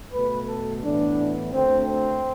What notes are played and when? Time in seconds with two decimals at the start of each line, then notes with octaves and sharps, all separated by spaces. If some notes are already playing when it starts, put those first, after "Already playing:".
0.13 B2 A3 B4
0.48 A4
0.83 A2 E3 B3 D4
1.52 D2 D3 A3 C4
1.86 C4